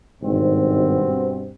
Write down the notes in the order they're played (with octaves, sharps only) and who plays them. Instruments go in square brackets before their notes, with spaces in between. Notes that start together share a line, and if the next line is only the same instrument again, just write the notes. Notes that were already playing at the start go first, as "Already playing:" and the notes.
[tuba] G#1 [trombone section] G2 B2 C4